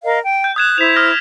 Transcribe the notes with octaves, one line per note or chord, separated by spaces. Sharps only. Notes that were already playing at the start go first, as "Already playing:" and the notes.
A#4 D#5 F5
G5
G6
D#6 F#6 G#6 E7
E4 C5 B6 F7
D#6 F6 A#6